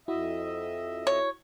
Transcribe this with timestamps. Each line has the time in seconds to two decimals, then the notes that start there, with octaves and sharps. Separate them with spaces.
0.08 F2 E4 F#4 D#5 E5
1.07 C#5